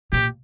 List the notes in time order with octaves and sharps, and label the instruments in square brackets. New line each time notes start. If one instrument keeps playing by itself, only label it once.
[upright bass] A#2 [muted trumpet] G4